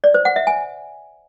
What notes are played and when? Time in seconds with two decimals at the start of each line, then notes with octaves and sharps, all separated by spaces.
0.04 D5
0.14 C5
0.25 F#5
0.36 E5
0.47 G#5